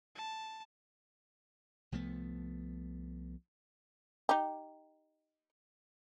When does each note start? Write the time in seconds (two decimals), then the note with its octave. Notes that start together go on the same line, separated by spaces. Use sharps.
0.15 A5
1.92 C2 F3 A3 B3
4.29 D#4 G4